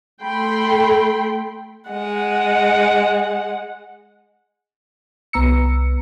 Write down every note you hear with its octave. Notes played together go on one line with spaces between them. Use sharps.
A3 A4 G5 B5 C6
G#3 F#5
C2 B3 A#5 E6 C#7